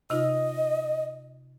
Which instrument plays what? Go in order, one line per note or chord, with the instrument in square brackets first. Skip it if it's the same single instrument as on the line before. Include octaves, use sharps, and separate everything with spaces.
[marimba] C3 D#4 F4 [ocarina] D#5